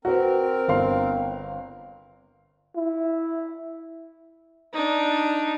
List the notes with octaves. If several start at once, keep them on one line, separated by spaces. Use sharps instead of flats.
C4 F#4 A#4 B4
G1 F5 C6
E4
D4 D#4